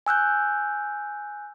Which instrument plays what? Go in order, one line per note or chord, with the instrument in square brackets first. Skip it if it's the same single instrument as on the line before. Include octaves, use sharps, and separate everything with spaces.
[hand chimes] G#5 E6 F#6 G6